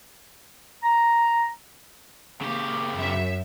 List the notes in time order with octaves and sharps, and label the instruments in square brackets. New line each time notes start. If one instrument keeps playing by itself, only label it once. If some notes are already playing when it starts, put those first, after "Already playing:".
[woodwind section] A#5
[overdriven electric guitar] C#3 G4 [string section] A#3
[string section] F#2 E5